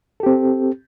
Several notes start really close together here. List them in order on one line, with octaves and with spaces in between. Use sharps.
A4 G4 C4